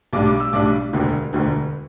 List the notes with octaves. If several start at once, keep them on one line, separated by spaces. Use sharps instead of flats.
B1 A2 G3 D4 D6
D6
E6
B1 A2 G3 D4 D6
E1 D2 D3
E1 D2 D3